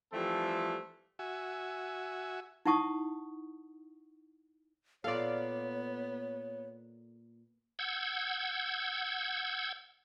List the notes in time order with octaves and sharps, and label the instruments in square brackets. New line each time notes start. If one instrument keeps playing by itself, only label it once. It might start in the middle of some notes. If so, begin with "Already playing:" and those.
[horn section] E3 F3 G3 A3 C4 A4
[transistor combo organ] F#4 E5 G#5
[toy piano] D#4 E4 F#5 A5 C#6 D#6
[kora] A#2 A4 [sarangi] B3 [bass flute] C#5 [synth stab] D5 F5
[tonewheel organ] F#5 E6 G6 G#6